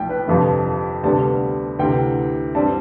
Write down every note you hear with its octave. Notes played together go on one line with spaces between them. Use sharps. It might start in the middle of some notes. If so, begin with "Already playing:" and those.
Already playing: B1 A2 F3 G5
B4
G1 F2 C3 F3
D2 C3 G3 B3 A5
D2 C3 E3 G5
G2 E3 G3 C4 A5